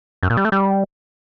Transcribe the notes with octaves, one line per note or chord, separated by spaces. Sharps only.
F#2
A#2
G3
A3
G3